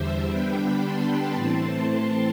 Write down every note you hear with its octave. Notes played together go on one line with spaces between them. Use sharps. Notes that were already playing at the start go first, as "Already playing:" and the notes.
Already playing: E2 D3 G3 C5 E5
D3 G3 B3 D4 G5 B5
A5 C6
A2 E3 A3 C4 A5 C6
A5 C6